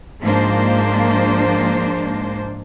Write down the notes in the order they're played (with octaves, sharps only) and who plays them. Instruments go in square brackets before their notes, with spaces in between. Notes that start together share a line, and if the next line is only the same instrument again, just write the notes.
[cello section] G#2 F3 G#3 A#3 D4 C5